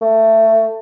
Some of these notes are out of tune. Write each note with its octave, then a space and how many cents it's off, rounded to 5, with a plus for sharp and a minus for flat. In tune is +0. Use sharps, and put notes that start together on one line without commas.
A3 +15